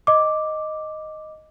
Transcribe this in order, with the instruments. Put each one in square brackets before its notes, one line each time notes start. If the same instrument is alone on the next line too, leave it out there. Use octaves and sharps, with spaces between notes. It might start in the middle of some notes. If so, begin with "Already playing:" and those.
[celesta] D#5 D6